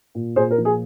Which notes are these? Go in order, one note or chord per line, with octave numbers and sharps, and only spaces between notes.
A#2
A#2 G#4 C5
A#4
F3
G#4